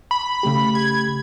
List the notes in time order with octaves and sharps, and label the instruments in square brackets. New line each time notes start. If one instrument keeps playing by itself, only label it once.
[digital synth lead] B5
[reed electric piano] C#3 A3 G4
[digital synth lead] G#6